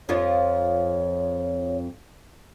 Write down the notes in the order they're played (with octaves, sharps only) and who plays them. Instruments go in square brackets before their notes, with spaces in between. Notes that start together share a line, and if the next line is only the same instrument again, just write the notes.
[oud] F2 F3 F4 [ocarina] C#5